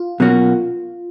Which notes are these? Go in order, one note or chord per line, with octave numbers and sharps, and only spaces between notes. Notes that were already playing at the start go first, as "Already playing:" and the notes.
Already playing: F4
B2 F#3 A#3 C#4 F#4